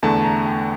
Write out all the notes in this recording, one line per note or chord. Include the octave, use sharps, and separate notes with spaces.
E2 D3 A3 A5
A#5
G5